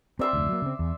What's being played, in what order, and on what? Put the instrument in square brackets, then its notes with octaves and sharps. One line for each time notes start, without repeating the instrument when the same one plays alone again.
[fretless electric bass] C4 [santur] D5 E5 C6
[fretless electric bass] F1 D2
F#3 A#3
C#3 C4
E2